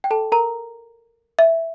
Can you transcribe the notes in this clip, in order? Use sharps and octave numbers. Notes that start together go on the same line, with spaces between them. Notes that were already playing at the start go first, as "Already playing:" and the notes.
G5
A4 A5
A#4 A#5
E5